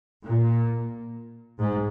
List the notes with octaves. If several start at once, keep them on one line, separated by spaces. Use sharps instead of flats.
A#2
G#2